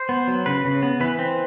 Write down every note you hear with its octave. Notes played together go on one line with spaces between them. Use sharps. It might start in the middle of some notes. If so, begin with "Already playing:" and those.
Already playing: C5
B3
F#3
C#3 B4
C#3
B3
E3 B4
C4